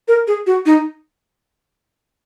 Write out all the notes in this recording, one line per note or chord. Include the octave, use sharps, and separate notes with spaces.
A#4
G#4
F#4
D#4